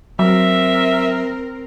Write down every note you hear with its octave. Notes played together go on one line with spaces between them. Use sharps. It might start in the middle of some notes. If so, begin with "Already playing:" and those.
F#3 C4 A#4 E5